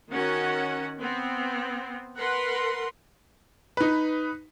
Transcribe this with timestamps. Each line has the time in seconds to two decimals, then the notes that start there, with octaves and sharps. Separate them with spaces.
0.12 D#3 C#4 F#4 F#5
0.99 B3 C4
2.18 A#4 B4 F#5 C6
3.77 D#4 B4